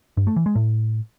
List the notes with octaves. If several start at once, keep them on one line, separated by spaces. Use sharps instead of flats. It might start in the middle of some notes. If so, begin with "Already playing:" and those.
G2
A3
E3
G#3
A2